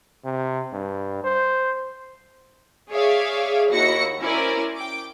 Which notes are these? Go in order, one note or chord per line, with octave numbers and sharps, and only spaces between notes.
C3
G2
C5
G#4 C#5 D5 E5 F5
D#2 E4 F#4 A#6 C#7
C#4 E4 A#4 C5 D5 G#5
G5 D6